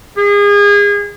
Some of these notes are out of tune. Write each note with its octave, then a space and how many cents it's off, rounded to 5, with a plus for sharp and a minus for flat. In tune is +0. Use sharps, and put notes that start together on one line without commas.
G#4 -30